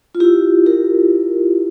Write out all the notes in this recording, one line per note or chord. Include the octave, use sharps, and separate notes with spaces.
F4
E4 G4
G4 A#4